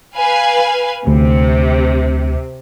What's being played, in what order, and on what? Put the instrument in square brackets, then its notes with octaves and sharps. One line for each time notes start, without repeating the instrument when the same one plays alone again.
[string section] B4 F5 G#5
[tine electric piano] D2 [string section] C3